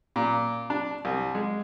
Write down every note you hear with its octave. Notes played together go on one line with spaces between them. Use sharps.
A#2
D4
C2
G#3